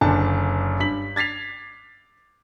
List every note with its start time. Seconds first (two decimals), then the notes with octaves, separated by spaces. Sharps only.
0.01 F#1 D3 G#5 A5
0.80 G2 B6 F#7
1.16 G#6 A6 B6 C7 F7